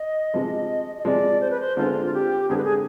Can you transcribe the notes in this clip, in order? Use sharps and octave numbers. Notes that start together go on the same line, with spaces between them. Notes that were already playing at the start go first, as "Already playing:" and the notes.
Already playing: D#5
C3 F3 G#3
D#5
C3 F3 G#3 D5
C5
B4
C5
D3 G#3 C4 F4
F4
G4
D3 G#3 C4 G#4
B4
G#4